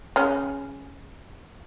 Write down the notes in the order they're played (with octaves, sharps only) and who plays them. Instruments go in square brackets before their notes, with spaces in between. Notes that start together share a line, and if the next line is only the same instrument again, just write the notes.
[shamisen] C#3 C#4